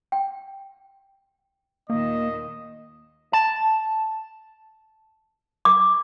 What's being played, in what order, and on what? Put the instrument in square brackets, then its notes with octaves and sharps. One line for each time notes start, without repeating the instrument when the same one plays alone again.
[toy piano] G5
[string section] D#2 A#2 D#3 [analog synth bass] A#3 [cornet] D#5
[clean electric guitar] A5
[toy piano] D6